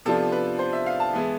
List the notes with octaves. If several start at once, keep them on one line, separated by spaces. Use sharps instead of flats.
C3 F3 B3 D4 F4 A4
B4
C5
E5
F5
A5
E3 G#3 B3 E4